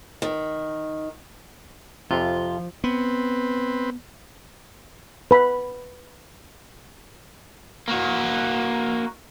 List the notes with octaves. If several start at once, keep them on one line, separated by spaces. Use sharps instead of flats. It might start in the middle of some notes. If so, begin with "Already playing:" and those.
D#3
F2 C3 F3 F4
B3 C4 B4
B4 B5
A#3 F#4